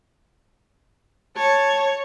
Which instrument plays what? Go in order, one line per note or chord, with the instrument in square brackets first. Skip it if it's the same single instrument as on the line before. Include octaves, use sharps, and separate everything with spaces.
[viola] C#5 [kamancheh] A5